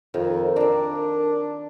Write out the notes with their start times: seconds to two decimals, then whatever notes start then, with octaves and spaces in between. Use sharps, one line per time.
0.14 F2 D#3
0.56 A#3 C4 D4